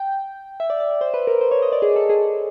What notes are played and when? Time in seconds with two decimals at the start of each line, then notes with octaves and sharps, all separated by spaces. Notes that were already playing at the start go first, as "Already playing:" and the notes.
Already playing: G5
0.60 E5
0.70 D5
0.80 D5
0.91 D5
1.01 C5
1.14 B4
1.27 A#4
1.41 C5
1.51 C#5
1.62 D#5
1.72 D5
1.82 G#4
1.96 A4
2.09 G#4